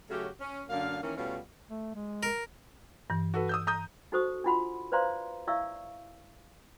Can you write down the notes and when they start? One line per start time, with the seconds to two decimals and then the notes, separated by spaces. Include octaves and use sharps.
0.10 C#3 F#3 A3 C#4 F#4 G4
0.41 C#4
0.69 F#2 D3 A#3 F5
1.03 D#3 E3 A#3 C#4
1.17 B2 G3 A3 C#4 F4
1.70 A3
1.95 G#3
2.23 A#4
3.10 G2 E3
3.34 F#4 A4 B4
3.49 D#6 E6 G6
3.67 A#5 D#6 G6
4.12 D#4 F#4 A4 C5 C#6 D#6
4.44 D4 E4 F4 F#5 B5 C6
4.92 B4 C5 D5 F5 A#5 C6
5.47 E4 D5 E5 F5 C#6 E6